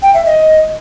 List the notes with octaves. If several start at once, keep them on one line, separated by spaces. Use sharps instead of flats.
G5
E5
D#5